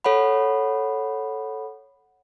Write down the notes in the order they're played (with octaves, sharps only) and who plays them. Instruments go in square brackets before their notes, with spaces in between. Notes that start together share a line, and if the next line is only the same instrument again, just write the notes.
[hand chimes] A4 C#5 F#5 B5